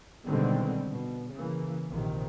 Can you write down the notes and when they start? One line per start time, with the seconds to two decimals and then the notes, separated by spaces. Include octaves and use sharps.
0.24 B2 D3 D#3 G3 G#3 C4
0.92 B2
1.34 C#3 E3 A#3
1.90 A#1 C3 D#3